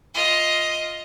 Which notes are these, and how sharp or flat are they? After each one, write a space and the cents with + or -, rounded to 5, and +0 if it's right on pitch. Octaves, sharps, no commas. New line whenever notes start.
F4 +0 D#5 +15